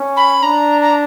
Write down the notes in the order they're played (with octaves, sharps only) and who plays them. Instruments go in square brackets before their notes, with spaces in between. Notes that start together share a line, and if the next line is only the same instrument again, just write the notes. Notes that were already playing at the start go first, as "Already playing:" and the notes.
Already playing: [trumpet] C#4
[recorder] B5
[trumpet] D4 [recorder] A#5
[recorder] A#5